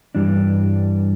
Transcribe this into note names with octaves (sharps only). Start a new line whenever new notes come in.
G2 E3 G3 D4